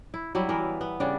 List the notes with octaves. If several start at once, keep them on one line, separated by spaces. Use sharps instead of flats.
E4
F#3 G3 E4
E3 B3 A#4
B3
C#3 G3 D4